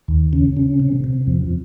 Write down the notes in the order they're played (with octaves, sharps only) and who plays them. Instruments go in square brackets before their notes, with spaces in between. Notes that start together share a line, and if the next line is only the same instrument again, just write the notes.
[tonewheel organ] D#2
C#3
C#3
C3
C3
F2